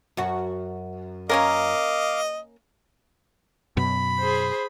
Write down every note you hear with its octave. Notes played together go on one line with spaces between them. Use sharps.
F#2 F#4
A#3 C#4 A#4 D#5 F5 D6
F#2 B2 B5
G#4 C5